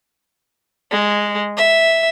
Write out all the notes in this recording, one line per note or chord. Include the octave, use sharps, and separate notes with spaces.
G#3
E5